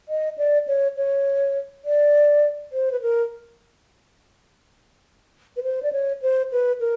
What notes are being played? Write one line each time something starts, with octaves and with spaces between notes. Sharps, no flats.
D#5
D5
C#5
C#5
D5
C5
B4
A#4
B4
C5
D5
C#5
C5
B4
A#4